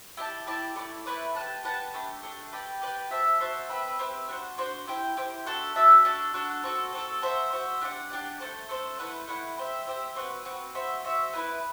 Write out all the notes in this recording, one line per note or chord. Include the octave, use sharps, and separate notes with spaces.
E4 G4 D5 A5
E4 G4 D5 A5
A3 E4 B4 D5
A3 E4 B4 D5
G4 B4 F#5 A5
G4 B4 F#5 A5
A3 D4 G4
A3 D4 G4
G4 B4 D5 G5
G4 B4 D5 G5
F#4 C5 E5 A5
F#4 C5 E5 A5
C4 G4 B4 E5
C4 G4 B4 E5
D4 F#4 C5
D4 F#4 C5
E4 G4 C5 G5
E4 G4 C5 G5
D4 F#4 A4 E5
D4 F#4 A4 E5
D4 F#4 A4
D4 F#4 A4
C4 F#4 A4
C4 F#4 A4
F#4 C5 E5
F#4 C5 E5
D4 G4 D5 F#5
D4 G4 D5 F#5
A3 D4 A4 C5
A3 D4 A4 C5
A3 E4 B4 F#5
A3 E4 B4 F#5
G4 C5 E5
G4 C5 E5
C4 F#4 B4
C4 F#4 B4
F#4 C5 E5
F#4 C5 E5
B3 E4 B4